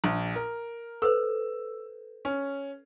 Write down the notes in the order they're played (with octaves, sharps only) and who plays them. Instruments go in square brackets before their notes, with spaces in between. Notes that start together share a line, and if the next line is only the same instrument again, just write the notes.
[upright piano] A#1
A#4
[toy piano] A4 B4 C5 [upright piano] E6
[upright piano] C#4